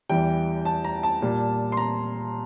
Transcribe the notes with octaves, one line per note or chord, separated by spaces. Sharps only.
E2 E3 G3 G5
A5
A#5
A5
A#2 G3
C6
A#5